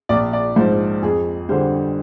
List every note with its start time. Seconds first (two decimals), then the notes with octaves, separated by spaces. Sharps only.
0.09 A#1 D5
0.33 D5
0.56 G#2 F3 C5
1.02 F2 G#4
1.49 D3 G3 C5